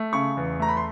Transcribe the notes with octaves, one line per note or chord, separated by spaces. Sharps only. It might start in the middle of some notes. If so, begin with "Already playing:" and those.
Already playing: A3
C#3 C#6
E2
A3 A#5
B5
C6